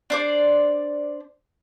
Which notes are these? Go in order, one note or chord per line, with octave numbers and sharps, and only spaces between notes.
D4 C5 D5